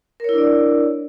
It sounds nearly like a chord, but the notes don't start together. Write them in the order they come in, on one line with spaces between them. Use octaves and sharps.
A#4 C#5 E4 D4 D5